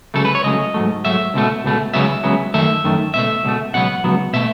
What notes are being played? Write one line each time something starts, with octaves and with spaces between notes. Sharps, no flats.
C#2 C#3 F#3 A3 A4
B4
C#5
C#2 C#3 F#3 A3 D#5
G#2 F#3 A3
G#2 F#3 A3 E5
C#2 B2 A3
C#2 B2 A3
C#2 C#3 F#3 B3 E5
C#2 C#3 F#3 B3
F#2 D#3 A3 E5
F#2 D#3 A3
C#2 B2 A3 E5
C#2 B2 A3
C#2 B2 F#3 B3 F#5
C#2 B2 F#3 B3
B2 A3 E5